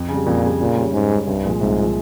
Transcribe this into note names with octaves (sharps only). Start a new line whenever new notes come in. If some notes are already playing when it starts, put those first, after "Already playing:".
Already playing: F2
C#3 G3
F2 A#2
C#3 G3
A#2 C#3
G3 C#4
G#2 C#3
G3 C#4
C2 G2
A#2 F3 G#3
C2 G#2
A#2 F3 G#3